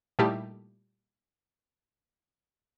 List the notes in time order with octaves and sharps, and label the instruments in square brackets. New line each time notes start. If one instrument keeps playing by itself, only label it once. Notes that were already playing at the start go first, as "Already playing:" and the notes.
[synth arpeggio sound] A#2 G3 A3 D#4 E4 G4